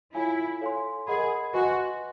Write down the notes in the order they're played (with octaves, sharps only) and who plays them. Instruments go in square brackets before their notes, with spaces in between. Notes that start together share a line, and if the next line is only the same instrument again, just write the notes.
[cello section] E4 [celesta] F4 A4 C#5 F5 G#5
[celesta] A4 C#5 F5 G#5 C6
[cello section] G#4 [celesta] A#4 D#5 F#5 B5
[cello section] F#4 [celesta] B4 D#5 G#5 C6